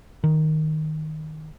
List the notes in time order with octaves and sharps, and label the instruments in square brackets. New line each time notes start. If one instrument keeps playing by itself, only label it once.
[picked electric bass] D#3